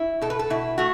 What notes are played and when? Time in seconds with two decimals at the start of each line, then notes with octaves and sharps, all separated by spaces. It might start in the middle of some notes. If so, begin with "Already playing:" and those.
Already playing: E4
0.21 B2 A4
0.30 B4
0.39 A4
0.50 B2 E4
0.78 A3 F#4